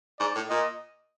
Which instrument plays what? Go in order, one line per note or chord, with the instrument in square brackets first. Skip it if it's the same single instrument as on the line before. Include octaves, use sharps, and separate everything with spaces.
[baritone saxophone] G#2 [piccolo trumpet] D5
[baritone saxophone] A2
[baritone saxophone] A#2 [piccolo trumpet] D#5